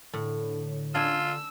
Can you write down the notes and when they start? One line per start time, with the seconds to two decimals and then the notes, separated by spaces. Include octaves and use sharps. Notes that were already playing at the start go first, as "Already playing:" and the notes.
0.14 A2 D3
0.95 D4 F4 G#5 E6